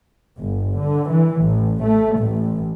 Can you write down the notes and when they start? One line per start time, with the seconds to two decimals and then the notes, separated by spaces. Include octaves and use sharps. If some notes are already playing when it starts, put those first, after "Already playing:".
0.39 G1
0.80 D3
1.11 E3
1.45 A1
1.84 A3
2.20 A1